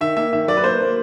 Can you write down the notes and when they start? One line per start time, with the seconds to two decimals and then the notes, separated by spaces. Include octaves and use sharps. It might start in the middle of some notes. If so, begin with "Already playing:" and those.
0.01 D#3 E5
0.17 A#3 E5
0.33 D#3 E5
0.48 F#3 D5
0.57 B4
0.64 A#3 C5
0.80 A#3